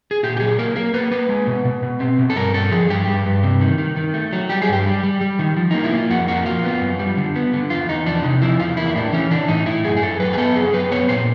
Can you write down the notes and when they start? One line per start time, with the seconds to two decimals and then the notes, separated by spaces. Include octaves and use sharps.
0.11 G#4
0.23 A#2 G4
0.37 G4
0.40 F#3 G#4
0.59 A#3 A#4
0.76 A#3 A#4
0.94 A#3 B4
1.11 A#3 B4
1.29 G#3
1.47 B2
1.65 B2
1.83 B2
2.00 C4
2.19 B2
2.30 A4
2.36 G2 A#4
2.54 G2 A4
2.71 F3 G#4
2.89 G2 G4
3.07 G2
3.26 G2
3.43 C3
3.61 D#3
3.78 D#3
3.96 D#3
4.14 A3
4.33 F#3
4.50 G3 G4
4.62 G#4
4.69 G2 G4
4.86 G3
5.03 G3
5.21 G3
5.39 D#3
5.57 F3
5.71 A#3 D#4
5.84 E4
5.93 A#3 F4
6.10 F2 F#4
6.28 A#3 F#4
6.46 F3 F4
6.64 B3
6.82 F#2
6.99 G3
7.17 D3
7.36 B3
7.53 D3
7.70 E2 F4
7.89 E2 D#4
8.06 F3 D4
8.24 C3 D#4
8.42 F3 E4
8.60 E2 F4
8.77 A#3 E4
8.95 A2 D4
9.13 E3 C#4
9.31 E3 D4
9.48 A2 D#4
9.66 A2 E4
9.84 F#2 G#4
9.97 G#4
10.02 F#2 A4
10.20 F#2 B4
10.33 G#4
10.37 B3 A4
10.56 F#2 G#4
10.73 F#2 B4
10.91 B3 C#5
11.09 A#2 C5